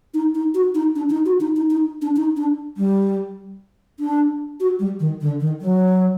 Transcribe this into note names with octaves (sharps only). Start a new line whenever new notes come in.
D#4
D#4
F#4
D#4
D4
D#4
F#4
D#4
D#4
D#4
D4
D#4
D4
G3
D4
F#4
G3
D#3
D3
D#3
F#3